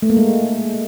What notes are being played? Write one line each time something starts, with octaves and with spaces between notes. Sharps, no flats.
A3
A#3
G#3